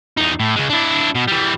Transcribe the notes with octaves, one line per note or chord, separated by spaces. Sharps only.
E2 D#4
A2
C#3 G#3
D4 E4
B2
E3 G3